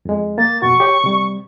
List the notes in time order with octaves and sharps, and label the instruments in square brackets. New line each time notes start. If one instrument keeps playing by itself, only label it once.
[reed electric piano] F2 G#3
[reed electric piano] A#3 [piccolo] A6
[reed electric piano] F2 B2 F#4 [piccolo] C#6
[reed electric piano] G4 C#5 G5
C3 G3